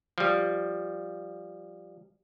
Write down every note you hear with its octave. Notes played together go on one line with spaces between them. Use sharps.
F3 G3